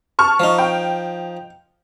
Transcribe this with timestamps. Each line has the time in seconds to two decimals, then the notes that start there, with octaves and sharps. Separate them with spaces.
0.19 A5 C#6 F6
0.40 F3 D#4
0.58 G5